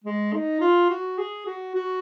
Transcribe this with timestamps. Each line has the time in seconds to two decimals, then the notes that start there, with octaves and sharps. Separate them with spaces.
0.04 G#3
0.33 D#4
0.61 F4
0.90 F#4
1.18 G#4
1.46 F#4
1.75 F#4